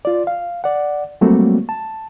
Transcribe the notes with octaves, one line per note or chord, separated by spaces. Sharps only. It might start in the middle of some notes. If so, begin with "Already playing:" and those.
F4 D5
F5
D5 F#5
F#3 G3 A3 A#3 C4 F#4
A5